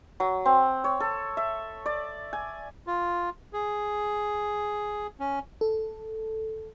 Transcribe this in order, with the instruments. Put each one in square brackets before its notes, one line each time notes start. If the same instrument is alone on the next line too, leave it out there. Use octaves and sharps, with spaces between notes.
[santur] F#3
C4
C#5
A4
E5
D5
G#5
[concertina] F4
G#4
C#4
[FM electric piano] A4